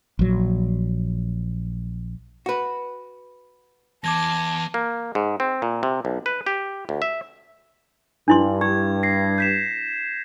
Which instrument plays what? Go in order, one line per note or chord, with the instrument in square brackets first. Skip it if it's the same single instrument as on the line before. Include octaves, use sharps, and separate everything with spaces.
[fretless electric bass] A#1 F#3
[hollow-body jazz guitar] F#4 B4
[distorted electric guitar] E2 [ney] A5 [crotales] D6 G#6 A#6
[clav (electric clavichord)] A#3
G#2
C4
A#2
C3
B1
B4
G4
D2
E5
[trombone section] G2 [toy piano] D4 E4 C6
[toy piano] G4 [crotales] G#6
[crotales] A#6 C7
G6 B6 E7